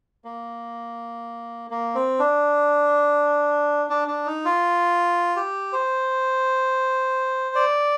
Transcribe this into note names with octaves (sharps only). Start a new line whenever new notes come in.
A#3
A#3
C4
D4
D4
D4
D#4
F4
G4
C5
D5